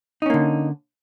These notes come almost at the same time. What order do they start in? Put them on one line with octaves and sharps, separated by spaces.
D#4 C#4 A#3 D3